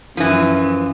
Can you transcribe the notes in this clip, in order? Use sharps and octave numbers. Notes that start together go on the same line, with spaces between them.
F#2 E3 F3